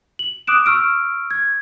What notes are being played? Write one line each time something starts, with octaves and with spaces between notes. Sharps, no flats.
F#7
D6 D#6 F#6 D7 E7
C#6 E6 F6 D7
G#6